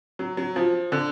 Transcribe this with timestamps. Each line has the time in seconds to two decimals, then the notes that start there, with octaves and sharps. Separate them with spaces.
0.19 F#3
0.37 F#3
0.56 F3
0.92 D3